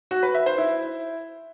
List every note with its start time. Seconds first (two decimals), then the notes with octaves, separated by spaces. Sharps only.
0.11 F#4
0.23 B4
0.34 E5
0.46 C5
0.58 E4